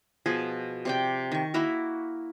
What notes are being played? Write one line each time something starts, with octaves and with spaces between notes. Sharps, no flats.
B2 F3 G#4
C3 D5 G5
D#3 C#6
A#3 E4 F#4 A#4